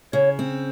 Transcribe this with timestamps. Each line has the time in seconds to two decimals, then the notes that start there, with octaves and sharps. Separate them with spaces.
0.13 C#3 C#5
0.39 C4